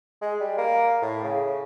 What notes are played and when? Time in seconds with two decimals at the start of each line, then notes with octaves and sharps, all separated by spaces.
0.22 G#3
0.40 G3
0.58 A#3
1.02 A2
1.24 C#3